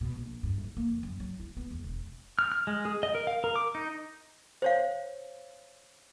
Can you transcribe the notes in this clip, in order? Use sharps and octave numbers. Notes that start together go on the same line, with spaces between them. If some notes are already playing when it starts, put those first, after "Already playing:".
B2
A#1
G2
E4
A#3
F2
F#2
F#3
E4
B3
E2
E1
F6
F6
G#3
G#4
D#5
A#4
F5
A#4
D6
D#4
C5 C#5 F5